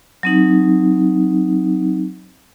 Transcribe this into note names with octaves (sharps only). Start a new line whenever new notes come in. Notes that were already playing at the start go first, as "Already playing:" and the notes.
F#3 C4 D#4